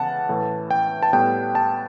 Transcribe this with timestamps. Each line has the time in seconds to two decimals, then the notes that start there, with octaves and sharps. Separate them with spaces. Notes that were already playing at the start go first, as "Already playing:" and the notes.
Already playing: C#3 E3 B3 F#5 A5
0.29 A2 E3 A3
0.71 G5
1.03 A5
1.13 A2 G3 B3 G5
1.55 A5